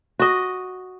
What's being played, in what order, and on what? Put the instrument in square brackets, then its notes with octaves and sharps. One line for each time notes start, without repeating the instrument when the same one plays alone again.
[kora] F#4 D#5